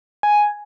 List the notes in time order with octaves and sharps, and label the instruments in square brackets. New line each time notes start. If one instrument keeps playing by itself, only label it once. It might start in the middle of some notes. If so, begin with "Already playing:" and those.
[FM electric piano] G#5